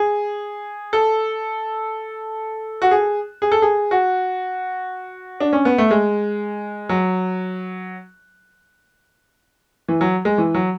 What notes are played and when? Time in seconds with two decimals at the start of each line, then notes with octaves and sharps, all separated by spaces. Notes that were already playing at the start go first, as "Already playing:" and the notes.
Already playing: G#4
0.93 A4
2.82 F#4
2.91 G#4
3.42 G#4
3.52 A4
3.62 G#4
3.91 F#4
5.40 D4
5.53 C#4
5.65 B3
5.78 A3
5.91 G#3
6.89 F#3
9.88 E3
10.01 F#3
10.25 G#3
10.38 E3
10.54 F#3